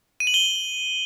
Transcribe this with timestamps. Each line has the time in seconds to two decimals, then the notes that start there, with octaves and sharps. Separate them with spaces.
0.20 D#7
0.27 F#7
0.34 G7